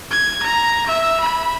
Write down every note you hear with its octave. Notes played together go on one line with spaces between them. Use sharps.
G#6
A#5
E5
B5